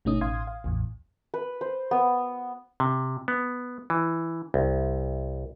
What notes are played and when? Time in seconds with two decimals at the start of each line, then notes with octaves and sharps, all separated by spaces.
0.05 G#1 B2 A3 C#4 D#4 D#6
0.21 A1 F5 C6 D#6 G#6
0.47 F5
0.64 A1 E2 A2
1.34 B4
1.61 C5
1.91 B3
2.80 C3
3.28 B3
3.90 E3
4.54 C2